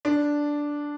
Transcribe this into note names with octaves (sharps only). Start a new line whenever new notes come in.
D4